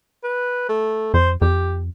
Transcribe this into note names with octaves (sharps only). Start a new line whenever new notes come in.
B4
A3
F2 C5
F2 G4